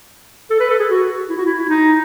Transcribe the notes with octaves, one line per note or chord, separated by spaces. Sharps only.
A4
B4
A4
G#4
F#4
E4
F#4
E4
E4
D#4